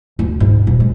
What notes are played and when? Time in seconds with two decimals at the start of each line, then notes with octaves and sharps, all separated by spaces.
0.19 D2
0.40 G#2
0.67 D#1
0.80 G#3